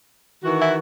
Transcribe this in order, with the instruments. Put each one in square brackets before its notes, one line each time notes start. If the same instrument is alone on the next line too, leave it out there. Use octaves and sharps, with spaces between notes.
[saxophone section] D#3 E3 F#4
[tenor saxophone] E4